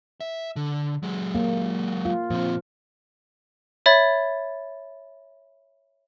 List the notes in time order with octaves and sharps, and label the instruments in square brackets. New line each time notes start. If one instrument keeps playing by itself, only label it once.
[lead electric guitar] E5
D3
F#3 G#3
[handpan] A#3
F4
[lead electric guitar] A#2 C4 [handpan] F3
[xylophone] C#5 E5 B5 A6